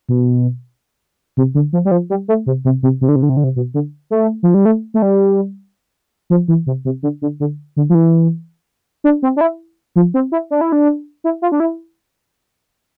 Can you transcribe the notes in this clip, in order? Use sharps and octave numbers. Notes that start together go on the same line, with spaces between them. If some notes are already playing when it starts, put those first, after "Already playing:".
B2
C3
D3
F3
G3
F3
G3
A3
C3
C3
C3
C3
D3
C3
D3
C3
D3
C3
B2
D3
A3
F3
G3
A3
A3
G3
F3
E3
C3
C3
D3
D3
D3
D3
F3
E3
D4
C4
D4
E4
F3
C4
E4
D4
E4
D4
E4
F4
D4
E4